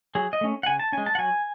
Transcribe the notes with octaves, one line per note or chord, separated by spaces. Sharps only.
F#3 G#4
D#5
A3 C#4
F#5
C#3 G#5
A5
C#4 G#5
G#3
A5
F#5
F#3 G#5